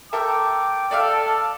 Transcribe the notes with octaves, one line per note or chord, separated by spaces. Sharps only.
A4 A#4 E5 G5 D6
A4 D5 E5 F5